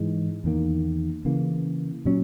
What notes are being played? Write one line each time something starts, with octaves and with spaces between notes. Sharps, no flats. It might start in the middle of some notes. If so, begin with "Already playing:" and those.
Already playing: G#2 E3 G#3
E2 D#3 A#3
C#3 E3 A#3
A#2 F#3 C#4